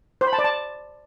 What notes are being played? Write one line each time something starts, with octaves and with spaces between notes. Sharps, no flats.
C5
B5
A5
D5
A5